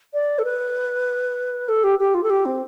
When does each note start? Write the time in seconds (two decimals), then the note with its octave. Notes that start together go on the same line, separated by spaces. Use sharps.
0.14 D5
0.39 A4
0.45 B4
1.69 A4
1.84 G4
1.99 G4
2.14 F4
2.23 A4
2.30 G4
2.45 C4